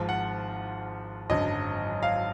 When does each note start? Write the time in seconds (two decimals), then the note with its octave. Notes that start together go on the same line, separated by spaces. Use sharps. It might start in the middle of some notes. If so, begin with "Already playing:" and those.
Already playing: G#1 G#2 F3
0.09 F#5
1.30 G#1 F#2 D3 F#3 D#5
2.03 F5